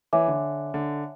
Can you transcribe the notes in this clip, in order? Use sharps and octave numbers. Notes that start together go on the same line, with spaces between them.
E3 C#5 E5 G#5 D6
D3
D3